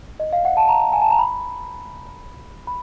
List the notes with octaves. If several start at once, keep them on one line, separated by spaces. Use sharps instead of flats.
D#5
F5
F#5
A5
A#5
G#5
A5
A#5
B5
B5